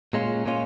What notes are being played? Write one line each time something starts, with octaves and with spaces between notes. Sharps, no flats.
A#2 G#3 C#4 F4
A#2 G#3 C#4 F4